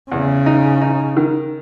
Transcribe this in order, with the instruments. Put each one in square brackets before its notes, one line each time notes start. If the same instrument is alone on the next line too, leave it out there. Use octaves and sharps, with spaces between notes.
[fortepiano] E2 [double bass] C#3
[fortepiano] D#4
D#4
D#3